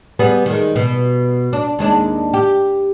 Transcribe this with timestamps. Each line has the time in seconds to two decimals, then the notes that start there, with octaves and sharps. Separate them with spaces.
0.19 G3 B3 G#4
0.46 D#3 G#3
0.76 B2
1.53 D4
1.79 D#2 G#3 D4
2.34 G4